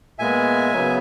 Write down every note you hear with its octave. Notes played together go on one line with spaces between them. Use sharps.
A#2 G#3 B3 E5 G#5
C#3 F#3 B3